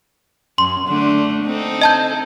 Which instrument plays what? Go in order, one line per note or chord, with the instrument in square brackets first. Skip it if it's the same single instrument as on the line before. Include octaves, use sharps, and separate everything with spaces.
[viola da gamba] F#2 [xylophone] C6
[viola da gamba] D3 A3 D4
C4 D#4 A4
[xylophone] D#5 A5 G6